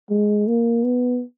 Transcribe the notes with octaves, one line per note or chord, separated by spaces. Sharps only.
G#3
A#3
B3